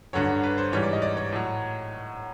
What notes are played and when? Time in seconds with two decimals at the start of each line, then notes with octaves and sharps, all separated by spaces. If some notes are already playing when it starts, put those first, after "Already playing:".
0.13 G2 D3 F#3 C#5
0.43 B4
0.58 C5
0.72 G#2 E3 G3 C#5
0.83 D5
0.93 D#5
1.02 D5
1.17 C#5
1.33 A2 F#3